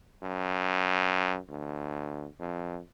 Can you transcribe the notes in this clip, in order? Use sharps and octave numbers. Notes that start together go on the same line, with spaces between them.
F#2
D2
F2